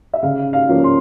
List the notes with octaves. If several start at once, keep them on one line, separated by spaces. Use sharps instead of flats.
E5
C#3 F5
F5
F3 A#3 C#4
C6